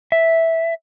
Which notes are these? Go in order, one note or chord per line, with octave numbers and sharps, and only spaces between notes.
E5